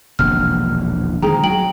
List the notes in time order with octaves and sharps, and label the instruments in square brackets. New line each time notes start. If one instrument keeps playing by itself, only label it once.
[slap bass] E1 A#1 D3 [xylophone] F6
[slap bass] D#3 G3 G#3 [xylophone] G#4 G5 A#5
[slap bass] F#3 [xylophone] G5 F#7